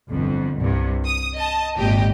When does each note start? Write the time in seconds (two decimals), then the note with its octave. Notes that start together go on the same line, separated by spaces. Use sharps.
0.11 G1 F2
0.58 C2 G2 C3
1.07 D#6
1.36 D#5 A5
1.77 G#1 A#2 G4 D#5